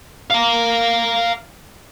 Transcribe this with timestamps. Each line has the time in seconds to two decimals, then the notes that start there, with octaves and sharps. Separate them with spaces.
0.30 F5 A#5